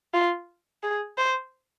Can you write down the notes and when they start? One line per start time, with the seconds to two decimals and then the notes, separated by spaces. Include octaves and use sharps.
0.14 F4
0.83 G#4
1.18 C5